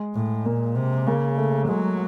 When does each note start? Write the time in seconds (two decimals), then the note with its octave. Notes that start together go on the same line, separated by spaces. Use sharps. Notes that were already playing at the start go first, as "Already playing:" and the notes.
Already playing: G#3
0.15 A2
0.45 A#2 A#3
0.76 C3
1.07 C#3 A#3
1.37 A3
1.68 F#3 G#3